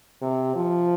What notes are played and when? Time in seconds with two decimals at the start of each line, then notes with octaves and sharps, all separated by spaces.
0.22 C3
0.55 F3